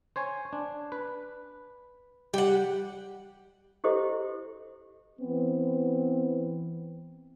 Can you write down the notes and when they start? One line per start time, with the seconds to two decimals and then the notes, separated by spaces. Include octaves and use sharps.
0.16 C5 C#5 G#5
0.53 D4
0.92 B4
2.34 G3 G4 F#5
3.84 E4 F#4 G4 A4 C5 D#5
5.19 E3 B3 C4